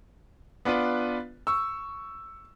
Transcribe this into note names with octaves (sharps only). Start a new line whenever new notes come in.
B3 D4 F4 B4
C#6 E6